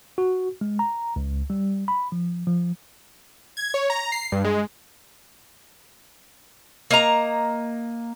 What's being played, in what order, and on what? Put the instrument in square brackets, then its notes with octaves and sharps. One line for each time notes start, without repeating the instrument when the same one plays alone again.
[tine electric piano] F#4
G#3
A#5
C#2
G3
B5
F3
F3
[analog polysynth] G#6
C#5
A#5
C7
G2
G#3
[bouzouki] A#3 D#5 A#5